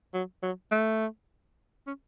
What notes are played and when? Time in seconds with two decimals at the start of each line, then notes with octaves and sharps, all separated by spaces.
0.14 F#3
0.43 F#3
0.72 A3
1.87 C#4